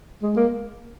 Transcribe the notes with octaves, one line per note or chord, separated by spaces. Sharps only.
G#3
A#3